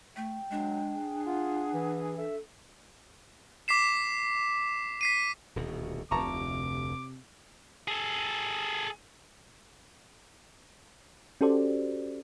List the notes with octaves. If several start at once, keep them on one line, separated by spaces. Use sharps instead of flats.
A3 G5
F#3 G#3 D4
G#4
F4 F#5
E3
A4 E5
D6 B6 C7 E7
B6 C7 D#7
D#1 D2 B2
F1 D2 C3 A5 A#5 C#6 D6
G#4 A4
C#4 F#4 G4 A4 C5 D5